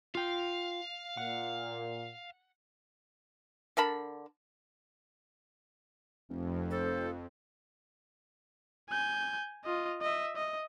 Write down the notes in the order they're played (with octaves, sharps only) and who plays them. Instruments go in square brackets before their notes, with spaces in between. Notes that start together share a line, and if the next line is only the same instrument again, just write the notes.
[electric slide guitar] F4 G5 [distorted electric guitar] F5
[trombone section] A#2 [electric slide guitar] F#5
[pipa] D3 A#4 A5 B5
[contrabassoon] F1 [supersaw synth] F2
[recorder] A4 [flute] C5
[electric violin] G#5 G6
F4 D#5
D#5 E5
D#5